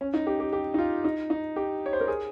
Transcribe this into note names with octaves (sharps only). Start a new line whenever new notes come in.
C#4
D#4
G4
G4
G4
D#4
F4
D#4
D#4
G4
C#5
C5
A#4
G#4